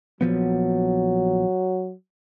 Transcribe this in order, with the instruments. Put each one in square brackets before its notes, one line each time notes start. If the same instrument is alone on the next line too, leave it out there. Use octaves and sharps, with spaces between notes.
[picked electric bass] A#1 F3 B3 [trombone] F#3